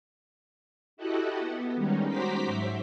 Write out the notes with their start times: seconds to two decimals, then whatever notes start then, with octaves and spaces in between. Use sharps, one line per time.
0.97 E4 F#4 G4 A4 D#5 F#5
1.39 B3
1.75 D#3 G3 G#3 C#4 D#4
2.07 F#4 C5 A#5 C6 D6 B6
2.46 G#2 F#3 C5 E5